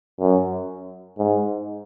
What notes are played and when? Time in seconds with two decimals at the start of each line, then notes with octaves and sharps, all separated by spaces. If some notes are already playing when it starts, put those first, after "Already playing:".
0.20 F#2
1.18 G#2